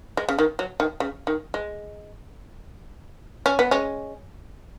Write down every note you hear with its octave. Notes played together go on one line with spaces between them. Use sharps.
G#3
C#3
D#3
F#3
D#3
C#3
D#3
G#3
C#4
B3
G#3 C#4